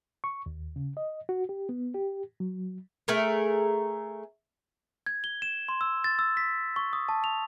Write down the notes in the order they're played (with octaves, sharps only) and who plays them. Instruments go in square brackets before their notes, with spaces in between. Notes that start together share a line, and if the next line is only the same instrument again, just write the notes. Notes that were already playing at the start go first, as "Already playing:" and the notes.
[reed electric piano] C#6
D#2
C#3
D#5
F#4
G4
B3
G4
F#3
[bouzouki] A3 G#4 A#4
[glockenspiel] G#6
G7
E7
C6
E6
A6
E6
B6
C#6
D#6
A5
F7